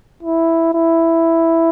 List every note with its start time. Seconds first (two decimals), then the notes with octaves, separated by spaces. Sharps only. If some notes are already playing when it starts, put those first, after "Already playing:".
0.23 E4
0.74 E4